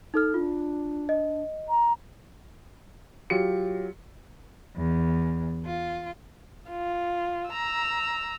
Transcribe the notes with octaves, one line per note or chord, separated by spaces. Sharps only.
D#4 A4 F6
D4 F4
D#5
A#5
F#3 F4 G4 C#7
E2
F4
F4
A#5 E6